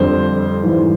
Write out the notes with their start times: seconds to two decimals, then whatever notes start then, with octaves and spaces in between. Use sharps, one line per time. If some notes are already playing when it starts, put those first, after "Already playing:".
Already playing: F2 D3 G3 C5
0.63 G#2 E3 G3